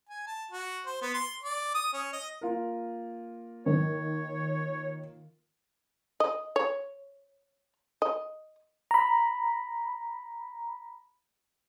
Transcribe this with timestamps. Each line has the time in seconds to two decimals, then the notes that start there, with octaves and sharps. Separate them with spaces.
0.09 G#5
0.27 A5
0.51 F#4
0.86 C5
1.02 B3
1.14 C6
1.43 D5
1.75 D#6
1.93 C#4
2.13 D#5
2.41 A#3 F4 A#4
3.66 D#3 C#5
6.20 D#5
6.56 C#5
8.02 D#5
8.91 A#5 B5